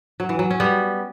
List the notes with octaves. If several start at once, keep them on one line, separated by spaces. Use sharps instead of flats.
F#3
E3
F#3
C#4
G3 B3